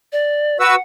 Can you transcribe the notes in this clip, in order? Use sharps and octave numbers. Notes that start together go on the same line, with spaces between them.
D5
F#4 B4 F#5 E6